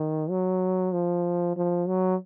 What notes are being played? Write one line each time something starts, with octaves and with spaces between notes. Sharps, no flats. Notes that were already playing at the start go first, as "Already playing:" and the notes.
Already playing: D#3
F#3
F3
F3
F#3